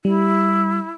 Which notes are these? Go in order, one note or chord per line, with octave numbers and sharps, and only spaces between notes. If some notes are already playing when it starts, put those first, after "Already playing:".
G3 E4